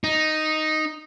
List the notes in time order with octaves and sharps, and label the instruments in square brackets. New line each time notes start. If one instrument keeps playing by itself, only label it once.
[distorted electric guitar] D#4